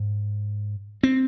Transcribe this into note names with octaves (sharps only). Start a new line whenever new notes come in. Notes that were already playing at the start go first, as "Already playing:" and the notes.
Already playing: G#2
C4